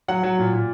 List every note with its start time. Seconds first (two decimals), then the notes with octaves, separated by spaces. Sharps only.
0.08 F#3 F#5
0.23 F#3
0.39 A#2
0.53 A#2